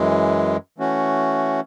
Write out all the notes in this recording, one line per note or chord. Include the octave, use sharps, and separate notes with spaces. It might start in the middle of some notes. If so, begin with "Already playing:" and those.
Already playing: F#2 E3 G#3
E3 A3 C#4 F#4